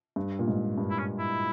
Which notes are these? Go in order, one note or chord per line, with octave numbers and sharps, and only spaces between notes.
G2
A#2
G#2
G2
E4
C#4
E4